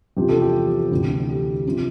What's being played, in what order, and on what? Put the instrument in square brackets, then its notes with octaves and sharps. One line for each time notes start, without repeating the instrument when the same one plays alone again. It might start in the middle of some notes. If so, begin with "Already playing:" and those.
[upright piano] E2 C3 F3 G4
A4
G4
D2 C3 E3
G4
C3 F3